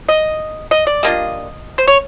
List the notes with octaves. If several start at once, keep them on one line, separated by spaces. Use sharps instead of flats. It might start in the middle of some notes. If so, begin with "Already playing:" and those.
D#5
D#5
D5
G3 A#3 D4 F4 D#5
C5
C#5